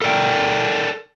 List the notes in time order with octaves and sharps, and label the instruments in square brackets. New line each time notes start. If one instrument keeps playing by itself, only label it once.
[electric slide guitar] A4 A#4 D5 G5